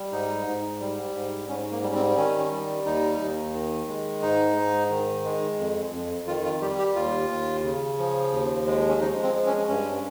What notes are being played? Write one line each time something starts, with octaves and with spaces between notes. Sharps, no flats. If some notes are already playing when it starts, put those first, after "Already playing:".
Already playing: G3
G#2 D#4
G#2
G3
G#2
G#2 C#4
A#3
G3 C#4
C4
D#3 C#4
G3
D#2 D#4
D#2
D#3
G#3
G#2 D#4
G#2
D#3
G#3
F2
F2
D#3 F4
F4
G3 G4
G4
D#2 F4
D#2
C#3
F3
D#2
G#3
C#4
F3 D#4
C4
G#3
C#4
G2 C#4